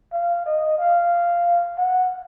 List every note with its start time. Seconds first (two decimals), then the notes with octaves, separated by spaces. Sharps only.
0.13 F5
0.46 D#5
0.78 F5
1.78 F#5